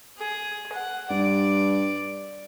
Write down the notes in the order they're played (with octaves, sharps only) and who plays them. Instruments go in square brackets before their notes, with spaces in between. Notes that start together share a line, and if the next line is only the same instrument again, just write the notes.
[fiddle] G#4
F#5
[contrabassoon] G2 [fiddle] D5